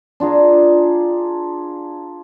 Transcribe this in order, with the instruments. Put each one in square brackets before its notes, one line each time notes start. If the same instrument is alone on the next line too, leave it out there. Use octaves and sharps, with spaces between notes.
[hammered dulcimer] D4 F4 G#4 A#5